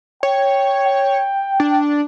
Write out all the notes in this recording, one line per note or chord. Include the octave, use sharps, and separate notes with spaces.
C#5 G5
G5
D4